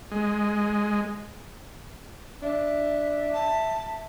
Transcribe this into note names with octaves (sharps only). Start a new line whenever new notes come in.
G#3
D4 E5
A5